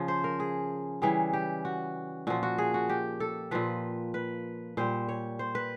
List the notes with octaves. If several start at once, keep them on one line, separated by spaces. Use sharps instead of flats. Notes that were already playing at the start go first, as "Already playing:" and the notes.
Already playing: C#3 F3
C5
A#4
G#4
C#3 E3 G3 G#4
G4
F#4
A#2 F3 F#4
F#4
G#4
F#4
G4
A4
A#2 F3 B4
B4
A#2 G3 C5
C#5
C5
B4